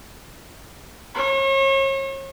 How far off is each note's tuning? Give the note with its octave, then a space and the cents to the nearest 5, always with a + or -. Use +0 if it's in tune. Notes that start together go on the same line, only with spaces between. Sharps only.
C#5 -40